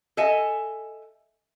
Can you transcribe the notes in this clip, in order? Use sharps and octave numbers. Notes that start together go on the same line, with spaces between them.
A4 D#5 E5 G#5